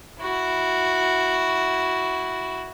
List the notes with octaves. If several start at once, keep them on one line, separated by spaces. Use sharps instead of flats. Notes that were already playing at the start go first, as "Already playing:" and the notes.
E4 F#4